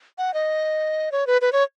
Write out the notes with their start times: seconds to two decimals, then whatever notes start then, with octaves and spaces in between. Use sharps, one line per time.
0.18 F#5
0.34 D#5
1.12 C#5
1.27 B4
1.42 B4
1.53 C#5